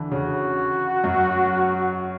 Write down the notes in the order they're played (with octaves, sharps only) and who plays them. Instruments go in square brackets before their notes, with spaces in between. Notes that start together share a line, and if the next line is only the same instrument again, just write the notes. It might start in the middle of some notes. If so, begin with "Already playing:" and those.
Already playing: [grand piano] D3 E3
[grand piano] C#3 [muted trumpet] F#4
[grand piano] F#2